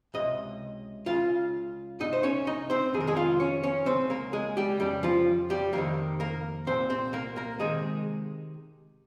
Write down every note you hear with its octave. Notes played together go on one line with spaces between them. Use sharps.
C#2 C3 D#5
C#2 C#3 F4 F5
C2 A#2 D#4 D#5
C5
C#4 C#5
D#4 D#5
C4 C5
F2 C3 D#3 G#4
A#4
G#3 G#4
F4 F5
C#4 C#5
C#4 C#5
C#2 C#3 C4 C5
A#3 A#4
G#3 G#4
G3 G4
F2 C#3 G3 G4
F3 F4
G3 G4
F2 C3 D#3 A#3 A#4
A#3 A#4
C2 A#2 C4 C5
C4 C5
A#3 A#4
A#3 A#4
C3 D#3 G#3 G#4